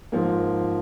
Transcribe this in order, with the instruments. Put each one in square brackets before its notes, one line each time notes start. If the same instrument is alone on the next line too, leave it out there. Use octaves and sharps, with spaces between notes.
[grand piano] G#2 F3 A#3